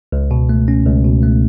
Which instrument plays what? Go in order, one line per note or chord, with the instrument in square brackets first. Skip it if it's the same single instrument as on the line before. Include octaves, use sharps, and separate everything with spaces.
[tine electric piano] C#2
B2
A3
C#4
C#2
B2
A3